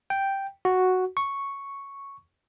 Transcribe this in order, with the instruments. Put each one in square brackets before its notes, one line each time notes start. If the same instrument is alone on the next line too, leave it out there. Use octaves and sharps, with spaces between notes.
[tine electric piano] G5
F#4
C#6